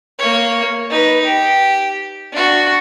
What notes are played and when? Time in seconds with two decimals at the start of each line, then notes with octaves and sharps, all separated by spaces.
0.19 A#3 C#5
0.90 D#4 B4
1.25 G4
2.32 D4 F#4